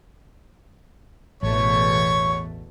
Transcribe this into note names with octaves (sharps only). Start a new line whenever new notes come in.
A1 E2 B2 A3 C#5 C#6